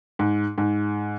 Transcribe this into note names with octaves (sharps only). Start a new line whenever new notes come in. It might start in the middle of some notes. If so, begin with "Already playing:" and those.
G#2
G#2